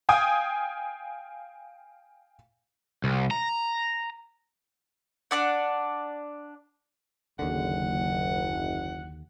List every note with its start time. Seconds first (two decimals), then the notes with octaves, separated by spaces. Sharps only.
0.09 F5 G5 G#5 D#6
3.04 C2
3.31 A#5
5.31 D4 D5 F#5
7.39 F#1 D#2 D3 F#5